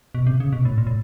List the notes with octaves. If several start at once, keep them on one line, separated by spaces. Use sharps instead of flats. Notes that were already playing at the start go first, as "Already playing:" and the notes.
B2
C3
C#3
B2
A2
A#2
A2